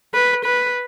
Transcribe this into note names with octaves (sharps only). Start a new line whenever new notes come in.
B4
B4